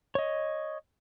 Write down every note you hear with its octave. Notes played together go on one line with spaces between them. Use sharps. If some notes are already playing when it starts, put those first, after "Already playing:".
C#5 D#5